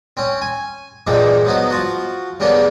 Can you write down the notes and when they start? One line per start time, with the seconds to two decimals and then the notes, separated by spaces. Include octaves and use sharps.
0.17 C4 C#4
0.41 G#5
1.07 G2 A#2 E3 F3 G3 G#3
1.45 F3 F#3 B3 D#4
1.70 F3 F4 F#4
2.40 G2 C#3 A#3 B3 D4